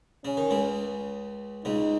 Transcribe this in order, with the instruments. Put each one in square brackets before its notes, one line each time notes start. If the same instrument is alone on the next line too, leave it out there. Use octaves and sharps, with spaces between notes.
[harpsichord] C#3 [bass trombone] C#4
[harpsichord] D#3
C#2 C#3
[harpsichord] C#2 C#3 [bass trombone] D#4